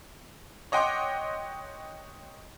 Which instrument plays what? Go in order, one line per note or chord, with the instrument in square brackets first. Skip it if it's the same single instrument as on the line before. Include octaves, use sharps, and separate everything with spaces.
[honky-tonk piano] C#5 D#5 F#5 G5 C6 D6